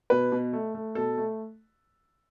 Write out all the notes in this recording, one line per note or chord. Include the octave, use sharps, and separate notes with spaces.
B2 B4
B2
A3
A3
B2 A4
A3